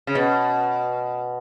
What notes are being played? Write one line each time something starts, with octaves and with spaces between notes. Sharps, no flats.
C#3
B2